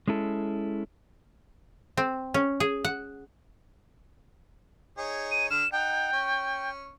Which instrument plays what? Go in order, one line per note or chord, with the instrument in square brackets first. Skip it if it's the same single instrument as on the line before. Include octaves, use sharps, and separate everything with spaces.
[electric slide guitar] G#3 C#4 E4 A4
[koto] C4
C#4
G#4
F#5
[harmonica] D#4 G#4 C#5
[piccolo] D#7
[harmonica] D3 F6 [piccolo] E7
[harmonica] D#4 F#5 [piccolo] G5
[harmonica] C#4 C#6